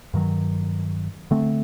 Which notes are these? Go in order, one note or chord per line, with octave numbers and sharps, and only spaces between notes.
G2 D#3 F#3
D3 A3 C4